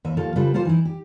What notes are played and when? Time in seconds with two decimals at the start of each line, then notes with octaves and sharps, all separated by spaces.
0.05 D#2 B4 E5
0.17 D#2 F3 A4 F5
0.36 C#3 G3 F4 A4 B4 C5
0.54 A#3 F4 G4 A4 C5
0.65 E3 D#4 E4
0.85 G4